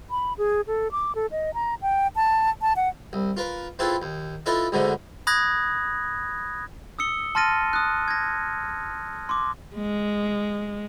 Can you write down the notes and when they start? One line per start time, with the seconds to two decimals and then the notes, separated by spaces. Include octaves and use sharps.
0.10 B5
0.38 G#4
0.67 A4
0.92 D6
1.15 A4
1.31 D#5
1.54 A#5
1.82 G5
2.16 A5
2.62 A5
2.76 F#5
3.13 C2
3.37 F4 A#4 B4
3.79 C4 E4 F4 G#4 A4 B4
4.02 D#2
4.46 E4 F4 A4 B4 D#5 E5
4.72 D2 G#2 B2 D3 G#3 A3
5.27 B5 D#6 F#6 G#6 A#6
6.99 D#6 E6 C#7 G7
7.35 A5 C6 F6 A6 A#6 D#7
7.73 D#6 F#6
8.08 G#6 A#6
9.29 C6 D6
9.75 G#3